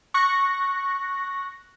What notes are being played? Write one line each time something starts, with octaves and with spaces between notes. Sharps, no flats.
C#6 F#6 A#6